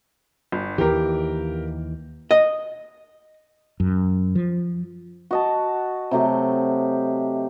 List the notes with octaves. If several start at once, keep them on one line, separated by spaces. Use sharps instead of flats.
G1
D#2 E3 G4 A#4
D#5
F#2
F3
F#4 D#5 A5
C3 F#3 A3 G4